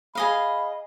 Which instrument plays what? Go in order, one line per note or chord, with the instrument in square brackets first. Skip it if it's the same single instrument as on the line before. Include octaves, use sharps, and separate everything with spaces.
[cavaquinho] G#4 D#5 F5 [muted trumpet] B5